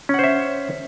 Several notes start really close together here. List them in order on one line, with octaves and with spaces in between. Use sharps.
C#4 F#5 C5 E5